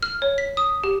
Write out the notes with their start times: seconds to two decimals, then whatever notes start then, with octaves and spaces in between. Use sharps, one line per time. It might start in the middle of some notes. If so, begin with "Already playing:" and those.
0.03 F6
0.22 C#5
0.38 B6
0.57 D#6
0.84 G4